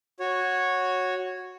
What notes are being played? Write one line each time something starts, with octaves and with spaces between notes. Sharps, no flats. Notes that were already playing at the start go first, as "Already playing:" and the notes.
F#4 C#5